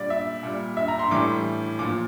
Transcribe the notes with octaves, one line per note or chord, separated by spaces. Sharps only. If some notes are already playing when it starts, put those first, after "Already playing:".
Already playing: A#2 G3 D5
E5
A#2 G3
E5
A#5
C6
A2 E3 G3 D6
A#2 F3 D6